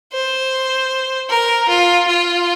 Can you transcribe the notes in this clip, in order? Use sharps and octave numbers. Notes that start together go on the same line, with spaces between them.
C5
A#4
F4
F4